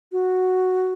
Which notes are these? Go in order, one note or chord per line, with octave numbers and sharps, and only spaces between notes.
F#4